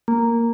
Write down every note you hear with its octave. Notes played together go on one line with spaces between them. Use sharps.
A#3